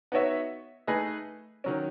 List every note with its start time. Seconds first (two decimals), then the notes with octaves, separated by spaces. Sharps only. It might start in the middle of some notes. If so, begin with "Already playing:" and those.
0.12 B3 D#4 F#4 C#5 E5
0.87 A3 D#4 G#4 B4 D#5
1.64 D#3 F#3 C#4